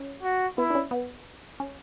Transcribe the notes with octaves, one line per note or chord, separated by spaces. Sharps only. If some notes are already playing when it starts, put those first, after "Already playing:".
Already playing: C#4
F#4
B3 E4
D4
C#4
B3
C#4